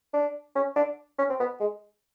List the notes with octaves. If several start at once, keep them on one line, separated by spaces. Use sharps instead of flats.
D4
C#4
D4
C#4
C4
B3
G#3